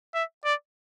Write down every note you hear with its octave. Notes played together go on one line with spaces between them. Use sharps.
E5
D5